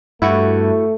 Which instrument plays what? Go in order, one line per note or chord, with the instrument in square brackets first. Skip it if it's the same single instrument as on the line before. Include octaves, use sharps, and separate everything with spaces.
[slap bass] G2 [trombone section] A3 [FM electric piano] E4 F#4 C#6